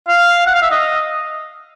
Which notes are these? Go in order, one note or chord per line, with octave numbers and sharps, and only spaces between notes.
F5
F#5
F5
E5
D#5